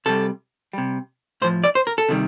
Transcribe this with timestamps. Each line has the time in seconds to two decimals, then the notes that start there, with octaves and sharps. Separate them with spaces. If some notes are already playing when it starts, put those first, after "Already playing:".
0.06 C3 G3 A4
0.73 C3 G3
1.42 A2 F3 C5
1.64 D5
1.75 C5
1.87 A#4
1.98 A4
2.09 C3 D#3 G3